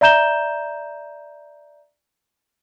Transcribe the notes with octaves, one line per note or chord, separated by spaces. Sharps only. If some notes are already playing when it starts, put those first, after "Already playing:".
D5 E5 A#5 G6 E7 G7